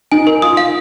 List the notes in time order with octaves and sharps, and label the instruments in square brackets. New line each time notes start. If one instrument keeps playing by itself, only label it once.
[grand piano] D#4 [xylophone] G#5
[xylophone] A#4
[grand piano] F4 [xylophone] D#6
[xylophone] F5